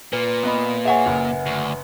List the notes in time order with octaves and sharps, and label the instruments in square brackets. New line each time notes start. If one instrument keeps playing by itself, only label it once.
[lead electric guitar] A#2 [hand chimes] B4
[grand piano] B3 D#5 B5
[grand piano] G#4 C#5 [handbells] E5 F#5 G#5
[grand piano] F#1
[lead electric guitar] D2